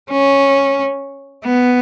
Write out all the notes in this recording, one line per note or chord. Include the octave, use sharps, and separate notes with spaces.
C#4
B3